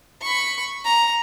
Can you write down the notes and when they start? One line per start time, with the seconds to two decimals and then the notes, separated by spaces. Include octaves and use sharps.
0.21 B5 C#6
0.84 A#5